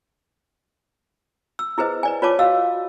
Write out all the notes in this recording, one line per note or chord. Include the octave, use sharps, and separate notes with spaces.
E6
E4 G#4 B4 C5 D#5
B4 D5 G#5
F4 B4 C#5 D5 A5 D6
F#4 D#5 F5 E6